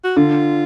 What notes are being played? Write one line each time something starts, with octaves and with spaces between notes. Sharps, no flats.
F#4
D3 F4